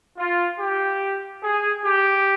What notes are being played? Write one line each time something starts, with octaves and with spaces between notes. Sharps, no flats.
F4
G4
G#4
G4